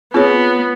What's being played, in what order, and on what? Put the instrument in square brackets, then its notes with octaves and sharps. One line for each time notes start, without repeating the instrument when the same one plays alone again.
[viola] B3 [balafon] C4 F4 G#4 C#5